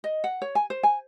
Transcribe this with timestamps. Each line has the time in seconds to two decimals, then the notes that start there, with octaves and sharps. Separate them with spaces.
0.04 D#5
0.24 F#5
0.42 C#5
0.55 G#5
0.70 C5
0.83 G#5